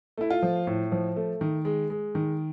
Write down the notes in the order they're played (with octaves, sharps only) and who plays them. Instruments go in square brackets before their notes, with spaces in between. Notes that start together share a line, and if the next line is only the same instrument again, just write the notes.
[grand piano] A3 E4
F4
F3
A2
F3
A3
D#3
G#3
G#3
D#3